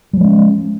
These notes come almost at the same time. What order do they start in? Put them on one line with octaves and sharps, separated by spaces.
G3 F3 G#3 C#4